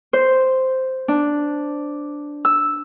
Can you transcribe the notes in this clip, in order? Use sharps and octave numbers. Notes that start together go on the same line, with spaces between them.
C5
D4
E6